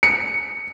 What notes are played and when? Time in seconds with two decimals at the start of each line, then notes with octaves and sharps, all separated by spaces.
0.03 C#7